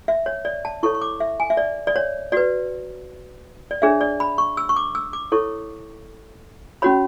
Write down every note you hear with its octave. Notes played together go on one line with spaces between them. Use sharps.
E5
C#5
D5
A5
E4 A4 C#5 C#6
C#6
D6
E5
G#5
E5
D5
D5
C#5
F#4 B4 D5
D5
D4 G#4 C#5 E5
D5
B5
C#6
E6
C#6
D6
E6
D6
E4 A4 C#5 C#6
C#4 F#4 C#5 B5